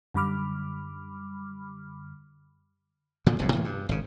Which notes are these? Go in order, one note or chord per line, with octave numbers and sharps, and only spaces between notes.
F#2 D3 G3 B5 D6 F6
A#2 D3 F3 F#3
F1 C2 F2 A2
A2 E3 A#3
G2
G#1 C#3